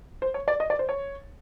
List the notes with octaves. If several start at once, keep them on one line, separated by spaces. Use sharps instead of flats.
C5
C#5
D5
D#5
D5
C5
C#5